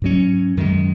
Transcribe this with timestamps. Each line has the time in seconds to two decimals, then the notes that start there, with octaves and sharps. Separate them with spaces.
0.02 G#2 F#3 C#4
0.57 F#2 D#3 G#3